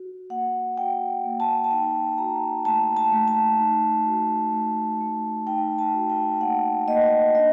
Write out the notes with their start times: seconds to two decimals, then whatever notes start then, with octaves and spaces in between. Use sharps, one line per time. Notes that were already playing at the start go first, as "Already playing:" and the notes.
Already playing: F#4
0.30 A#3 F#5
0.77 F#4 G5
1.24 A#3
1.40 A5
1.64 A5
1.71 D#4 G5
2.18 F#4 A#5
2.65 A3 A5
2.97 A5
3.12 A3
3.28 A5
3.59 D#4
4.06 F#4
4.53 A3
5.00 A3
5.47 D#4 G5
5.78 A5
5.94 F#4
6.10 G5
6.41 A#3 F#5
6.88 A#3 D#5
7.35 D4 D#5